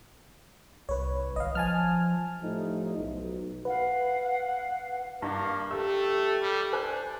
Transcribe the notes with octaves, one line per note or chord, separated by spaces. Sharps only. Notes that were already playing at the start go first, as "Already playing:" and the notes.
C2 B4 C#5
G#1 D#5 F5
F3 G#5 A5 F6
A2 F3 G3 A3 D#4
B1
B4 F5 F#5
G2 A#3
A3 G4 A4 E6
G3
D4 C5 G#5 F#6